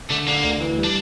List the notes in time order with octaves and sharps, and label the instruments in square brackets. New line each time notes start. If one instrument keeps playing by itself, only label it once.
[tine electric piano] D3 [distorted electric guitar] A3
[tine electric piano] D3 [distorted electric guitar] A#3
[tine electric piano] D2
E3
G3
[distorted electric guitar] D4